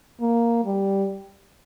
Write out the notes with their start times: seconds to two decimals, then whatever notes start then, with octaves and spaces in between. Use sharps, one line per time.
0.20 A#3
0.65 G3